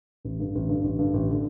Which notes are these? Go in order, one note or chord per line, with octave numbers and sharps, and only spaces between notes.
A1
G2 D3
A1
G2 D3
A1
G2 D3
A1
D3